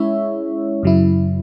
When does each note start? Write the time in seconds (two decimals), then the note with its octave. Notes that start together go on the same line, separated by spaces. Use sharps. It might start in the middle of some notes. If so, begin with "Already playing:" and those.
Already playing: G#3 C#4 E4 C#5 E5
0.83 F#2 C#3 F#3 E4